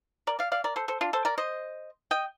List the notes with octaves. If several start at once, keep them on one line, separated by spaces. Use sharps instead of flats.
A#4 D5
D5 F5
D5 F5
A#4 D5
A4 C5
A4 C5
D4 F4
A4 C5
A#4 D5
C5 D#5
D#5 G5